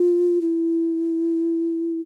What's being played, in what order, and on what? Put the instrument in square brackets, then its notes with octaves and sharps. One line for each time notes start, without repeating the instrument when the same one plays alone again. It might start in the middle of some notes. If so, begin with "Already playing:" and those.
Already playing: [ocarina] F4
E4